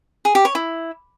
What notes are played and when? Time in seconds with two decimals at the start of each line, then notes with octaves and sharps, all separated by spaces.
0.25 G#4
0.35 G4
0.45 C#5
0.55 E4